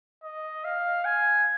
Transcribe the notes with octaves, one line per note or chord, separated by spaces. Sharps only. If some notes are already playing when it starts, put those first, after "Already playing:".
D#5
F5
G#5